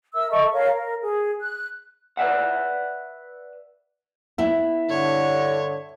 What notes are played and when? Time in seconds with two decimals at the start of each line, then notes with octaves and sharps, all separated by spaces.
0.15 A#4 E5 E6
0.31 A4 D#5 E5 C#6
0.53 A#4 C#5 F5
0.74 A#4
1.02 G#4
1.40 F#6
2.17 B4 D5 E5 F#5
4.38 B3 E4 E5
4.89 G2 D3 C#5